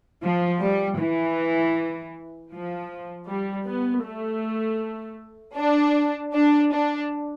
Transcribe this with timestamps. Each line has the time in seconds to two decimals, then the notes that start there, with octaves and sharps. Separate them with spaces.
0.22 F3
0.61 G3
0.99 E3
2.52 F3
3.28 G3
3.67 B3
4.04 A3
5.57 D4
6.34 D4
6.72 D4